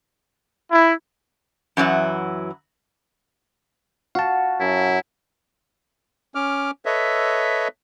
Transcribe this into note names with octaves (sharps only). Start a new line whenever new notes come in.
E4
F#2 E3 F#3 E4
F#4 F5 A5
F#2 E4
C#4 D6 F6
A4 B4 C#5 D#5 E5